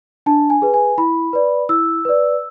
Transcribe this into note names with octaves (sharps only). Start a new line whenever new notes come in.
D4 A5
G#5
G#4 B4
G#5
E4 B5
B4 D5
E4 E6
B4 D5